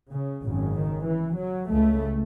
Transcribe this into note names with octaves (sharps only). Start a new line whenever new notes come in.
C#3
G#1 F#2 C#3
D#3
E3
F#3
C#2 C#3 A3